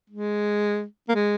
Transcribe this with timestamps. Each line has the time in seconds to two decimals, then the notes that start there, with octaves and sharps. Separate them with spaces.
0.10 G#3
1.09 A#3
1.15 G#3